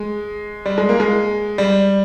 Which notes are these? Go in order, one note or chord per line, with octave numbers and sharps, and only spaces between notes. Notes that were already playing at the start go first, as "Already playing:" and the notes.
Already playing: G#3
G3
G#3
A#3
G#3
G3